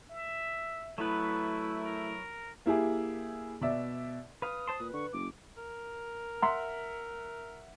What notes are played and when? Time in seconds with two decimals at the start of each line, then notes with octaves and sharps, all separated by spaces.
0.10 E5
0.98 F#3 A3 B3 E4 B4
1.81 A#4
2.66 A#3 E4 G4 G#4
3.61 B2 D5 E5
4.42 B4 F5 D#6
4.68 C5 A5 C6
4.80 A#2 B4
4.94 D3 C#6
5.13 F#1 D6
5.58 A#4
6.42 E5 F#5 A#5 C6